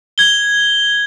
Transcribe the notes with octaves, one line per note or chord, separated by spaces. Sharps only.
G#6 G7